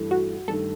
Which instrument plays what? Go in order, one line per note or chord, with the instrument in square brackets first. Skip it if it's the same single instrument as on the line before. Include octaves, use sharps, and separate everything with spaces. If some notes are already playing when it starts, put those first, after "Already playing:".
Already playing: [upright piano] G2 E3 A3
[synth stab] F#4
[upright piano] G2 D#3 A3 [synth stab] A4